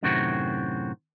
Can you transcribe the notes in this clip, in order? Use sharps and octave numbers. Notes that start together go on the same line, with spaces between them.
F#2 A2 C3 D#3 C4 F#4